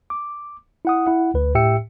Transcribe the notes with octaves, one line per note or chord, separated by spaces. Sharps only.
D6
E4 F#5 D#6
E4 F#5
D2 B4
A2 G4 E5 G5 E6 C#7